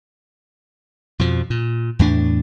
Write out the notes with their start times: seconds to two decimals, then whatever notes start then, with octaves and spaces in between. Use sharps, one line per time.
1.19 F2 B2 F3
1.50 A#2
1.99 E2 A2 D4